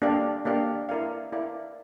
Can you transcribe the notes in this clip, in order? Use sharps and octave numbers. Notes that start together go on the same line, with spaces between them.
A#3 D4 G4 D5 F5
A#3 D4 G4 D5 F5
E4 A#4 D5 F5
E4 A#4 D5 F5